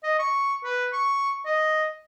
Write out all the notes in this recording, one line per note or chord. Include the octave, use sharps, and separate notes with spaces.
D#5
C#6
B4
C#6
D#5